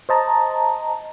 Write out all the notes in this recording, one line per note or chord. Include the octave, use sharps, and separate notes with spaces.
C5 D#5 A5 A#5